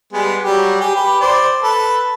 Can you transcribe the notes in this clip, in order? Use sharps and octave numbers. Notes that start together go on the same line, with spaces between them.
G3 G#3 B3
F#3 G3 G4
G4 G#4
G4 B4
C5 D5
A4 B4